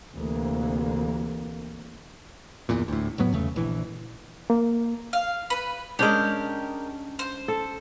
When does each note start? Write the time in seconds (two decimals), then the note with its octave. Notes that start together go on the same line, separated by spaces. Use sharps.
0.11 D2 C3 E3 A#3
2.69 G1 E2 A#2
2.88 D2 A2
3.18 F1 A2 F#3 B3
3.32 G1 E2 C#3 A3
3.56 A#1 E3
4.50 A#3
5.13 F5
5.50 B4
5.99 G#3 C#4 D4 G4 A#4
7.19 C5
7.48 A4